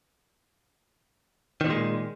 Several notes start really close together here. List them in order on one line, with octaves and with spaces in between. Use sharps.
D#3 A#2 G#3